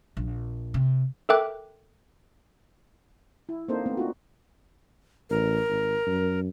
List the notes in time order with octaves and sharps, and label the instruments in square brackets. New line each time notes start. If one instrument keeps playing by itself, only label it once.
[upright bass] A#1
C3
[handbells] A4 A#4 E5 G5 D6 F#6
[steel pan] E4
A#3 C4 D4 D#4 A4 C5
A3 B3 C4
D4 D#4 F4 F#4
[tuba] A1 [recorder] A#4
[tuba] G#1
F#2